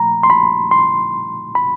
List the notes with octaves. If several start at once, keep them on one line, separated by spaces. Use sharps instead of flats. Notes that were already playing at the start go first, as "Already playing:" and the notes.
Already playing: A#2 F3 A3 A#5 B5
C6
B5
C6
B5